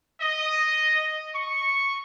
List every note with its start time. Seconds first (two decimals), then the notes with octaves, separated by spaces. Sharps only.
0.21 D#5
1.35 C#6